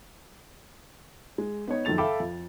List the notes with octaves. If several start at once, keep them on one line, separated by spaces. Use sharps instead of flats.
G#3
B3 D#4 C#5
F#2 D#3 F3 A4 A6 F7
A4 E5 F5 G5 B5 D6
F2